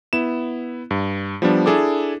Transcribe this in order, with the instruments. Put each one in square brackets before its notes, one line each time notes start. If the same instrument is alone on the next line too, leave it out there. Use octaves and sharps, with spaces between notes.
[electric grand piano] B3 E4 E7
G2
F3 G3 B3 D4
D4 E4 G#4 A4 D6